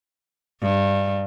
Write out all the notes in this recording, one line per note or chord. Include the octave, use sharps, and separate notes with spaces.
G2